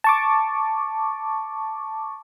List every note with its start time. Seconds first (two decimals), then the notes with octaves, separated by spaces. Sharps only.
0.04 A5 C#6 D6